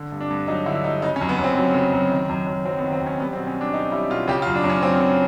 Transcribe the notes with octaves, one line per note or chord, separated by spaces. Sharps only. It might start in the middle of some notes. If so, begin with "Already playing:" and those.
Already playing: D3
G2
D4
G2
F#3 D#4
D3 E4
G2 D#4
C#3 D#4
C#4
F#2
B3
F#2
C4
F#3
C#3
F#2
D#3
F#2
F#2
F#3 C4
B3
D#3
C4
F#2
C#4
G3 B3
C4
B2
C#4
G3
D4
B2 D#4
G3 E4
B2 F4
C#3 G4
F4
F#2
D4
F#2
C#4
F#3 C4
C#3